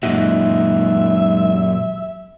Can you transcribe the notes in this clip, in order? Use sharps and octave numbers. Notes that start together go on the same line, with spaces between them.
F#2 A#2 G#3 D#4 F#4 E5